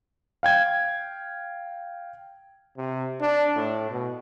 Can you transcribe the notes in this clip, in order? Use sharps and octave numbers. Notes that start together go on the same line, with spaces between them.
F5 G5 G#6
C3
D4
A2
B2